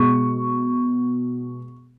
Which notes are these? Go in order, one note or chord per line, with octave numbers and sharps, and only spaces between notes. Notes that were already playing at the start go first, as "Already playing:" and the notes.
Already playing: B2 G#3 C#6